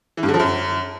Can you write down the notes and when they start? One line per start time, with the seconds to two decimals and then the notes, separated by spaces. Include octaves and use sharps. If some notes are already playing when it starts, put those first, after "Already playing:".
0.17 E3
0.23 G2
0.28 D3
0.34 F3
0.39 F#2